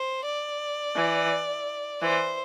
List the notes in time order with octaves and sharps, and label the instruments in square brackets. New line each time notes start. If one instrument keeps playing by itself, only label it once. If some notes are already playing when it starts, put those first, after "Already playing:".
Already playing: [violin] C5
D5
[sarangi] E3
[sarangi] E3 [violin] C5